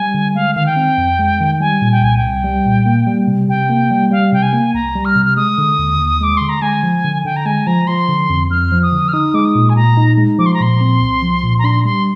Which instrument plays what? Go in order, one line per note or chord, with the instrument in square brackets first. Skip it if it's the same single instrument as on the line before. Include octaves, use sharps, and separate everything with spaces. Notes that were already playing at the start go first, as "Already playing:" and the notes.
Already playing: [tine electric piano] G3 [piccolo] G#5
[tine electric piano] D3
[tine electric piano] G#3 [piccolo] F5
[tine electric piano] D#3 [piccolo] F5
[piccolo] G5
[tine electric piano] C4
F2
G#3
D#3
[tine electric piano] G3 [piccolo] G#5
[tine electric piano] A#2
[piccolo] G5
[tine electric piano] C2 [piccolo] G#5
[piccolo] G5
[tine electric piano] C2
G3
A#2
A#3
G3
C3
[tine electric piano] C3 [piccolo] G5
[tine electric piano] A#3
G3
[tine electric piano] G3 [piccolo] F5
[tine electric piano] C3 [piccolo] G5
[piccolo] G#5
[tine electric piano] A#3
[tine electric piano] C2 [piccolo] A#5
[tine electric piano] G3
[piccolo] F6
[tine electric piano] C3
[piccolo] F6
[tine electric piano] G#3 [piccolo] D#6
[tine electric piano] D3
D#2
D#2
[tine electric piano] G#3 [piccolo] D6
[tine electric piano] D3 [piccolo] C6
[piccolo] A#5
[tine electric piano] G#3 [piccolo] G#5
[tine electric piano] F3
D3
[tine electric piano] D3 [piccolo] G5
[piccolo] A#5
[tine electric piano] G#3 [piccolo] G#5
[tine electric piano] F3 [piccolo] A#5
[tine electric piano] F3 [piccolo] C6
[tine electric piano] D3
F2
[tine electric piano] F2 [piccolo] F6
[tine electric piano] F3
[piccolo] D#6
[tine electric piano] D3
[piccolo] F6
[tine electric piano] D#4 [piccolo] D#6
[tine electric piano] G#3 [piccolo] D6
[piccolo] D#6
[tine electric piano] A#2
[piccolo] G#5
[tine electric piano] A#2 [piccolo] A#5
[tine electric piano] D#4
G#3
[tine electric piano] F3 [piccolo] D6
[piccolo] C6
A#5
[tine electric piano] A#2 [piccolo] C6
[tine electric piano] C4
C2
F3
A#2
[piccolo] A#5
[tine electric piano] D4 [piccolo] C6
[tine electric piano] G3 [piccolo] C6